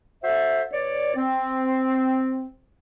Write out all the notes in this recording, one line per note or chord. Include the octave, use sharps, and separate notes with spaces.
F#4 A4 C5 E5
B2 C#5 D5
C4